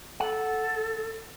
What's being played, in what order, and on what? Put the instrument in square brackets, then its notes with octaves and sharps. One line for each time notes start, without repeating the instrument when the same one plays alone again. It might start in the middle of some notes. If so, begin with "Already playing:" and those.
[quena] A4 [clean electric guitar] F#5